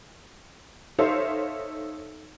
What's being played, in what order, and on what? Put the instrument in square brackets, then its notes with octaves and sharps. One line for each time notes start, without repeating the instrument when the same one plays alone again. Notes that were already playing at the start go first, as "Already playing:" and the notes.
[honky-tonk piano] D#4 A4 C5 C#5 E5 F5